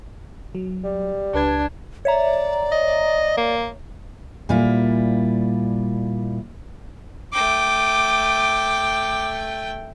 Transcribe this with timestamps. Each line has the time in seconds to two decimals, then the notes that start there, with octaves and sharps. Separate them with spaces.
0.55 F#3
0.84 G3
1.34 C#2 D4 B4 G#6
2.05 C#5 D5 E5 A#5
2.72 D#5
3.37 A#3
4.49 A#2 G3 E4 F4
7.33 A3 G5 D6